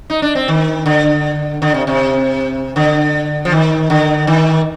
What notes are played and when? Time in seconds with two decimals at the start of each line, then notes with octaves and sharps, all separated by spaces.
0.10 D#4
0.22 D4
0.35 C4
0.48 D#3
0.86 D3
1.62 D3
1.74 C3
1.87 C3
2.76 D3
3.45 F3
3.52 D#3
3.90 D3
4.27 D#3